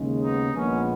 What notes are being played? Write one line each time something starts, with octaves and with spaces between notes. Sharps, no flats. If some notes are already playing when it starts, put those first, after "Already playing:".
Already playing: D#2 C#3 G#3
B3 D#4
A#1 A#2 G#3 B3 C#4